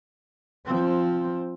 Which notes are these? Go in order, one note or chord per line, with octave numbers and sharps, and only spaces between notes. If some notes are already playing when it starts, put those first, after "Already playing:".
F3 C4